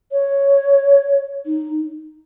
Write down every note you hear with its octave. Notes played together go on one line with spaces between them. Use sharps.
C#5
D#4